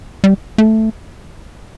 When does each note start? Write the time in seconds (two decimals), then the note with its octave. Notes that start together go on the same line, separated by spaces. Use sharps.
0.24 G3
0.58 A3